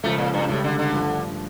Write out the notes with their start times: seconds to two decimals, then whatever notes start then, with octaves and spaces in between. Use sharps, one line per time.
0.03 C#2 C#3 F3 A3
0.18 A#2
0.34 G2
0.48 C#2 A2 C#3 G3
0.64 D3
0.79 D3
0.93 G2 F3 A3